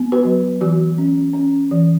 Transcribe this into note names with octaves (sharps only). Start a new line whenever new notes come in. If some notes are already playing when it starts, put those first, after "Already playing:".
Already playing: B3
F#4 B4
F#3
E3 F#4
C#4
C#4
E3